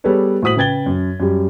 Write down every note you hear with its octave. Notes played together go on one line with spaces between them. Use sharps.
G3 B3 G#4 A4 B4 C#5
A2 F#4 C5 D#6 B6 F#7
C#3 B4 G5 G#6 A6 G7
F#2
F#2 G3